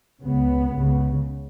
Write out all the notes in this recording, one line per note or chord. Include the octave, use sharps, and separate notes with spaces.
C#2 C#3 B3
C#2 C#3